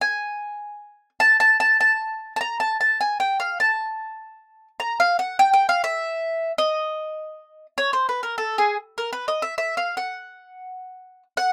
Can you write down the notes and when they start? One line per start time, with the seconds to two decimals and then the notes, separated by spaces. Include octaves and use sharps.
0.01 G#5
1.20 A5
1.40 A5
1.60 A5
1.81 A5
2.36 A5
2.41 A#5
2.60 A5
2.81 A5
3.01 G#5
3.20 G5
3.40 F5
3.60 A5
4.80 A#5
5.00 F5
5.19 F#5
5.39 G5
5.53 G5
5.69 F5
5.84 E5
6.58 D#5
7.78 C#5
7.93 C5
8.09 B4
8.23 A#4
8.38 A4
8.58 G#4
8.98 A#4
9.13 B4
9.28 D#5
9.42 E5
9.58 E5
9.77 F5
9.97 F#5
11.37 F#5